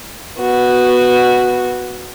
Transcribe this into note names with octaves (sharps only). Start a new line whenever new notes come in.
B3 F#4